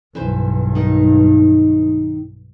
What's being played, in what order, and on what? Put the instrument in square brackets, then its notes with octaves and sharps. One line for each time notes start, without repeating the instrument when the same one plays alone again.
[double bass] B1 G2 [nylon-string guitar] E3 B4 C5
[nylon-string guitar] D#3 D#4